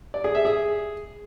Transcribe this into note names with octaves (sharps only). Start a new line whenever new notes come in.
D5
G#4
E5
G#4